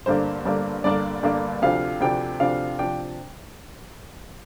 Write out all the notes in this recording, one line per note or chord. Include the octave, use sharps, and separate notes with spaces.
G1 G2 D3 A#3 D4 C5
G1 G2 D3 A#3 D4
G1 G2 D3 A#3 D4 D5
G1 G2 D3 A#3 D4
D2 C3 F3 D4 F5
D2 C3 F3 D4 G5
D2 C3 F3 D4 F5
C3 F3 D4 G5